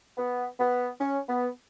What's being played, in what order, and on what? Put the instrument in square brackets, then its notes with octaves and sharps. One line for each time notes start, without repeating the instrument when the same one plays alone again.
[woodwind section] B3
B3
C#4
B3